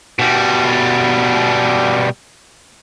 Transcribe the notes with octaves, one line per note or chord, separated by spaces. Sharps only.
B2 G3